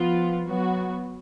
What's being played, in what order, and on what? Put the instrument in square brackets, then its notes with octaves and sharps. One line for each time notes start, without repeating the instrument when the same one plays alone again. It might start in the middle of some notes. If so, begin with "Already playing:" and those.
Already playing: [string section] F3 B3 F4
F#3 B3 F#4